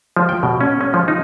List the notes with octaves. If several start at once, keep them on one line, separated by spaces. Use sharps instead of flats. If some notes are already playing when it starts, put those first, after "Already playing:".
F3
G5
B2
C#4
C#4
F3
D#4